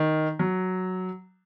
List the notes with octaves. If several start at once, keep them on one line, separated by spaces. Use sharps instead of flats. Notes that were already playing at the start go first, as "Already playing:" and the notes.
Already playing: D#3
F#3